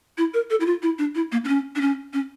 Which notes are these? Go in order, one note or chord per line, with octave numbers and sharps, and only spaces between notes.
E4
A#4
A4
E4
F4
E4
D4
E4
A#3
D4
C#4
D4
C#4
C#4